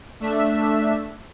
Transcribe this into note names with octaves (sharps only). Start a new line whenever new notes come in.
A3 D4 E5